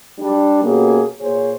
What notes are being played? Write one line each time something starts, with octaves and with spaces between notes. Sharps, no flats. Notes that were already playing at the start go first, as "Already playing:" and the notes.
G3 D4
B2 A#3 C#4 G4 G#4
A#2 G#4 C5 C#5